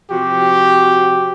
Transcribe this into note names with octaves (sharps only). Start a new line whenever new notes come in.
C3 F3 F#4 G4